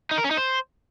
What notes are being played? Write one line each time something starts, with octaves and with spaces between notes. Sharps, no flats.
D#4
A#4
C#4
D#4
C5